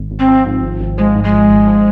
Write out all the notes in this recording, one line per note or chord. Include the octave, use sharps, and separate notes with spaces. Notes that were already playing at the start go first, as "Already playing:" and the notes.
Already playing: G#1
G#1
C4
F3
G#2
G#1
G#1
F3 G#3
G#2
G#3
G#1
G#1
F3